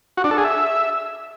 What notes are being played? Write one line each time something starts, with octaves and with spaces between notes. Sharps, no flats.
F#4
D4
A4
G#4
E5